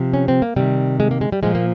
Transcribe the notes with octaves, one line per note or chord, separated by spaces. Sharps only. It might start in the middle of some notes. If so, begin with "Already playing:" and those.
Already playing: C3 F3
C#4
C4
A#3
C3 D#3 G3
G#3
A#3
G#3
G3
A#2 F3 G#3
A#3